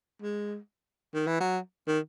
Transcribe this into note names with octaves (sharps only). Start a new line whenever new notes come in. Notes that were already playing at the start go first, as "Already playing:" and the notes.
G#3
D#3
E3
F#3
D#3